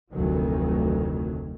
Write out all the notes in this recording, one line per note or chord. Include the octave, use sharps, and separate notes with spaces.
F1 D2 D#3 F#3